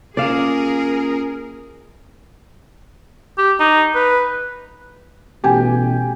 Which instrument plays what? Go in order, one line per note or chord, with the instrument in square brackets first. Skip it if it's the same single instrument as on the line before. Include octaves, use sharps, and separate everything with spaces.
[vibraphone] A#3 C#4 F4 [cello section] G#4 A#4 [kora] D5 F5
[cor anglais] G4
D#4
B4
[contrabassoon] A1 [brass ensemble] B2 [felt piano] G4 G5 G#5